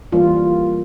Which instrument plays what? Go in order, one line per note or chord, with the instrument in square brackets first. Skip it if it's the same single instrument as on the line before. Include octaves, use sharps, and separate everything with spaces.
[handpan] E3 G3 A#3 F4